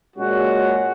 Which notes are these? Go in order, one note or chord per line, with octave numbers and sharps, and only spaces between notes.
A#2 G#3 C#4 F#4